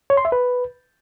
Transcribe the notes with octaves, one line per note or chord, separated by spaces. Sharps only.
C#5
C6
E5
B4